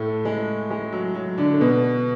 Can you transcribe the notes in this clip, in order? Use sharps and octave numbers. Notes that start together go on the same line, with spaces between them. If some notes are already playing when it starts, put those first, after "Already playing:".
Already playing: A2 A3
G#3
G#3
F#3
F#3
D3 D4
A3
B2 B3